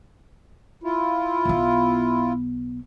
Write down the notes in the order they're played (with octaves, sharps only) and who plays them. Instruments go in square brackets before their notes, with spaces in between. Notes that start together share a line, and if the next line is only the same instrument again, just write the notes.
[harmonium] E4 F4
[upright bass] B1 B3